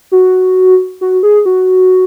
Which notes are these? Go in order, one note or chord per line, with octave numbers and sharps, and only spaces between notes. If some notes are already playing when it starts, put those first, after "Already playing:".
F#4
F#4
G#4
F#4